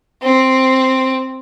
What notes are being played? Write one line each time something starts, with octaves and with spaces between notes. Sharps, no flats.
C4